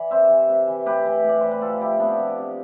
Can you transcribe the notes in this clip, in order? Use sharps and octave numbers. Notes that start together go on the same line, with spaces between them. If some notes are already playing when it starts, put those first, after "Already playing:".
Already playing: E3 D5
C3 C5 E5
E3
C3
E3
A2 G4 B4
E3
A2 D5
E3 C5
B4
C3 F4 A4
F3 E4 G4
C3 B3 D4
F3
C3